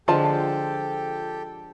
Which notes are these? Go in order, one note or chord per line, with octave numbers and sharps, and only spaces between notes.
D3 F3 G#3 F4 G4 A4 G5 A5